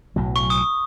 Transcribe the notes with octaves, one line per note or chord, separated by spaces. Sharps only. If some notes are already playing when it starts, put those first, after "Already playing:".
B1 A2 F#3
C#6
D#6